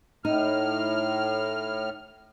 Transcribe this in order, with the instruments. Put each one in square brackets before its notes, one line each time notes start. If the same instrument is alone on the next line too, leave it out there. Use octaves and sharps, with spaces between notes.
[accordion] A2 F6 [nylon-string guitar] D#4